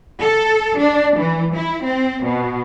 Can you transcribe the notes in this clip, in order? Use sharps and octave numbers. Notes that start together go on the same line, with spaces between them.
A4
D4
E3
E4
C4
B2